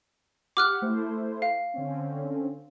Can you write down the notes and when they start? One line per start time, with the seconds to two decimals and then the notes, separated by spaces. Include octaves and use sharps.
0.57 G4 F#5 D6 F6 F#6
0.82 A3 E4 C5
1.42 F5
1.74 D3 C4 C#4